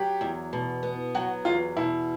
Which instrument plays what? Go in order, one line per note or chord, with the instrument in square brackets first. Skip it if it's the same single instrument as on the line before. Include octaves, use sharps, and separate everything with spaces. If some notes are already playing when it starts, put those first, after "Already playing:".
Already playing: [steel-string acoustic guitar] F#3 [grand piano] G4
[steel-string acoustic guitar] E2
B2
B3
[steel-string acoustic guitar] F#3 [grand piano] F#4
[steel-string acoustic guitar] E2 [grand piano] F4
[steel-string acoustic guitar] B2 [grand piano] E4